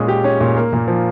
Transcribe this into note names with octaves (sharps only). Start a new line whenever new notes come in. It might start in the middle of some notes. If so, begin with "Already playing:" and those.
Already playing: A#2 G#3 C#4
G4
C#4
A#2
A#3
A#2
F3